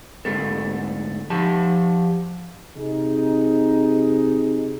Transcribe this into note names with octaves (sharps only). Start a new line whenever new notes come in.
D2 G#2 A4
F3 G4 A5
C3 D#4 G#4